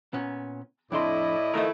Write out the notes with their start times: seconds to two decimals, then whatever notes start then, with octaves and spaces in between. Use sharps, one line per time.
0.13 A#2 B3 C#4
0.92 F2 A2 D4 E4 D5 D#5 C6
1.54 D#3 F3 A3 A#4 D#5